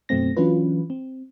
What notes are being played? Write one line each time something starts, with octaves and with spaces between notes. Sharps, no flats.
F#2 B2 F#3 A3 C4 A#6
E3 F#3 C#4 D4 F4 B4
C4